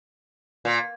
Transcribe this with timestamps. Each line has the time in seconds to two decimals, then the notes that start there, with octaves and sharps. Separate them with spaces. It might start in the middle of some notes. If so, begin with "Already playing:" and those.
0.65 A#2